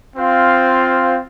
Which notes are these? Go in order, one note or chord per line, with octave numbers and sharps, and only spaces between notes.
C4 F4 C5 F5